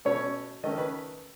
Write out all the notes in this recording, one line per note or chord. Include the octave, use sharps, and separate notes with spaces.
B2 A3 C#4 C#5
D#3 A3 C#4 D#5
B4